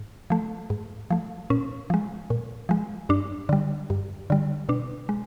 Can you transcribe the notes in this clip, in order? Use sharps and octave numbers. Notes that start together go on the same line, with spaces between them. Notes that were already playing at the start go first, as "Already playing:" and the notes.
Already playing: G#2
F3 A3
G#2
F3 A3
A#2 C#4
F3 G#3
A#2
F3 G#3
G2 D4
D3 G3
G2
D3 G3
B2 D4
G#3